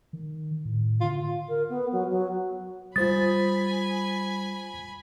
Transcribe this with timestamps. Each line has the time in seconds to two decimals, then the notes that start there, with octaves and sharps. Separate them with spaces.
0.13 D#3
0.65 A2
1.01 D3 F4
1.49 A#4
1.69 B3
1.92 F#3
2.10 F#3
2.96 G3 F4 C5 G#5 B5 D#6 A6